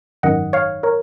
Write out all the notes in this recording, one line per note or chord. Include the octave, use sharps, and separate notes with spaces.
G#1 F#2 D#3 D#5 F#5
C#5 F5
A#4 C#5